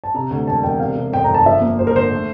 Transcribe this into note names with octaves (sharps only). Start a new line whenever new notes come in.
A5
C3 A#5
D2
E1 A5
E1 G5
C3 F5
C3
F2 G5
G1 A#5
A5
F3 E5
A#3
F3 C5
A#4
D3 C5
A3